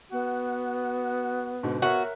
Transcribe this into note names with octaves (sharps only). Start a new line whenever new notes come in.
B3 F#4
G#2 B2 D3
F#4 A#4 C#5 E5